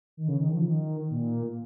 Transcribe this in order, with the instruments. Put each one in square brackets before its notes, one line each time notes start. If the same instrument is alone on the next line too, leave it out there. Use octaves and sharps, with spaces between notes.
[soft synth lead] D#3
C#3
D#3
F3
D#3
A#2